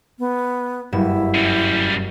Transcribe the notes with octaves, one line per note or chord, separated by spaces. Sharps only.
B3
F#1 G2 E4 E7
C#3 G3